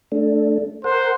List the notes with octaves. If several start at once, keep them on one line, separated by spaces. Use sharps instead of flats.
A3 D4
A#4 C5 F#5